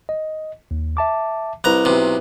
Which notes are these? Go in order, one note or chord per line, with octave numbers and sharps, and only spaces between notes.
D#5
D#2
E5 A5 D6
C2 E4 B4 A#5 F#6
B1 C3